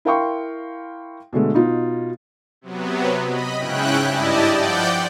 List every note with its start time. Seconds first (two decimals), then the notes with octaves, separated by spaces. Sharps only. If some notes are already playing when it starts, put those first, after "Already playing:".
0.05 E4 A#4 F5 G5 C6 C#6
1.33 B2 D3 G#3 A3
1.54 B2 D#4 F4
2.61 C3 F#3 B3
3.25 D#5 B5
3.58 G#2 C#3 C#4 E4 G5 F#6
4.06 G2 E4 G4 D5 D#5 A5
4.54 F3 D5 F#5 G5 G6